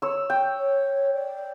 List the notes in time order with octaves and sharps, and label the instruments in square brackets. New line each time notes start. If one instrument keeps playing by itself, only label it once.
[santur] C#5 E6
G5
[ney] C#5
D5